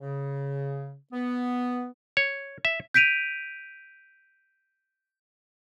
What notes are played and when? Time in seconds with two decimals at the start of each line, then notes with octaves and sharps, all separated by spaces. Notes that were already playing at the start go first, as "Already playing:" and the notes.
0.01 C#3
1.13 B3
2.17 C#5
2.65 E5
2.94 G6 B6 D7 D#7 F7